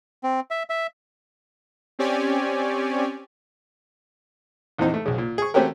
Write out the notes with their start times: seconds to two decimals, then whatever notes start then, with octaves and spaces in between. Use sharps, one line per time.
0.23 C4
0.51 E5
0.70 E5
1.99 C4 C#4 G4 C#5 D5 G#5
4.78 A#1 E2 E3 C4 D#4
4.94 A3
5.06 B1 C#3
5.18 A#2
5.38 G#4 C#6
5.54 A3 C4 C#4 F#4 G4 A#4